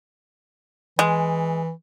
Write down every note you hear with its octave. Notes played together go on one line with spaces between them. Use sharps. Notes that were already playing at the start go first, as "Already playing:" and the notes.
E3 G#3